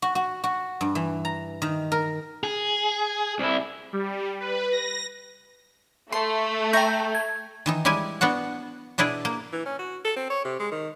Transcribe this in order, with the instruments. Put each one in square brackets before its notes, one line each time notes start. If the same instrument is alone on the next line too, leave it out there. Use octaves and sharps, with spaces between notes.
[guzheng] F#4
F#4
F#4
G2
E3
A#5
D#3
A#4
[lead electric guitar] G#4
[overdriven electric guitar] C2 E4
[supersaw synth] G3
B4
A#6
[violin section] A3 [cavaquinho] C6
[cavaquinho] E5 A#5 C#6 [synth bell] G5 G6
[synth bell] G#6
[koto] D#3 E3 D#4
G3 G#3 E4 G4 G#5
B3 D4 F#4 F#5
B2 D4 E4 G#4 D5
A#3
[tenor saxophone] E3
C#4
F#4
A4
C4
C#5
C3
G#3
D#3